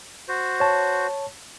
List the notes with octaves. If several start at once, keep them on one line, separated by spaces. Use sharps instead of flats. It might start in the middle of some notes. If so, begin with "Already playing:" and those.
F#4 C5
C#5 A5